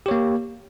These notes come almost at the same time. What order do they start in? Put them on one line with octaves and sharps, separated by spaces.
G4 C#5 A#3